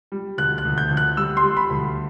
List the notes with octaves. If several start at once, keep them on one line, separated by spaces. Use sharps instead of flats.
G3
D2 F#6
F#6
D2
G6
D2
F#6
G3 E6
C6
G3
B5
D2